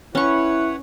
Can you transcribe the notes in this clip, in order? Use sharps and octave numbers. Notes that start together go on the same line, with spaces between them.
C#4 E4 B4 C#5 F#5 C#6